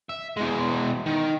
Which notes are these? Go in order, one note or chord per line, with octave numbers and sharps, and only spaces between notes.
E5
E2 G#3
D#3